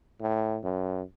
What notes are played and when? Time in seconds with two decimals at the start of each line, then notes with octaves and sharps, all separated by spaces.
0.21 A2
0.63 F#2